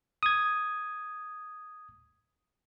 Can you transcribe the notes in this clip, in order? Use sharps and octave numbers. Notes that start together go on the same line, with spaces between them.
D#6 G#6